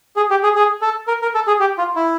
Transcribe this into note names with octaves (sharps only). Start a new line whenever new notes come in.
G#4
G4
G#4
G#4
A4
A#4
A#4
A4
G#4
G4
F4
E4